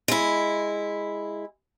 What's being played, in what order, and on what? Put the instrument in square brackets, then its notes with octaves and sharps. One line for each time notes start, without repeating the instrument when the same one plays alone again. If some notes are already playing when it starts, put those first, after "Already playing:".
[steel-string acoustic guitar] G#3 E4